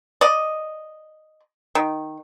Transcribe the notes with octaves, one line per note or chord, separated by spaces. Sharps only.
D5 D#5
D#3